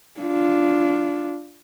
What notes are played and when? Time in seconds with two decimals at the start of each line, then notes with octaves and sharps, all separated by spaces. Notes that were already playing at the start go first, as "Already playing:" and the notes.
0.20 D4 F4